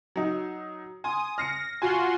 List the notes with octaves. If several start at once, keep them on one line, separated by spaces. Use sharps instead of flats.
F#3 D#4
G#5 C6 D#6
F6 A#6 C7 C#7
F4 F#4 G#5 C6